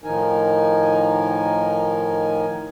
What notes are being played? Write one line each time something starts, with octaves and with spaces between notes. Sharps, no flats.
A2 D#3 F3 D#4 A#4 G#5